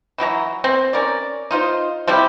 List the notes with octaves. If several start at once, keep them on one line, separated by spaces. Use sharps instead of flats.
E3 F#3 G4 A#5
C4
C#4 A#4 D5
D#4 F4 C5
C3 G3 E4 G4